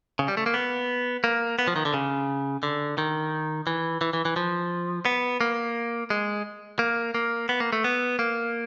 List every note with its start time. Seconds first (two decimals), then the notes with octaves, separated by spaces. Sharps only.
0.19 C#3
0.28 G3
0.37 A3
0.46 A#3
0.54 B3
1.24 A#3
1.59 B3
1.68 F3
1.76 D#3
1.85 D3
1.94 C#3
2.63 D3
2.98 D#3
3.67 E3
4.01 E3
4.13 E3
4.25 E3
4.36 F3
5.05 B3
5.41 A#3
6.10 G#3
6.79 A#3
7.14 A#3
7.49 B3
7.60 A#3
7.73 A3
7.84 B3
8.19 A#3